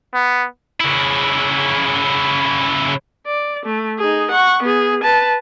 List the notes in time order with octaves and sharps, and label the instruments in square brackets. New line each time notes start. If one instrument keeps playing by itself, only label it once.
[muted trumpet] B3
[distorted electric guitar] C#3 E4
[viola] D5
A3
D#4 G#4
F#5 C#6
B3 G#4
B4 A5